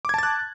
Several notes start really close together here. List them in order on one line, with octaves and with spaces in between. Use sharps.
D6 G#6 A5 A6 F#6